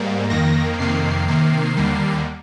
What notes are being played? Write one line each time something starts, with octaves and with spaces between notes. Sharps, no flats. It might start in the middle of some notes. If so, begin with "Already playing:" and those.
Already playing: G#2 G3 A#3
F2 D#3 A#3 A#6
F2 C3 D#3 A#3 C7
C3 D#3 A#3
D#2 D3 G3 A#3